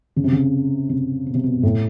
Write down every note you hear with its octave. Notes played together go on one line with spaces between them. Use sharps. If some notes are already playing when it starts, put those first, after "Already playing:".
C#3
C3
C#3
C3
B2
C3
B2
A2